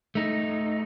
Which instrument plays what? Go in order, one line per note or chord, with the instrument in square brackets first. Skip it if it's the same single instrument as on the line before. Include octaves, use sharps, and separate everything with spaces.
[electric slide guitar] A3 D#4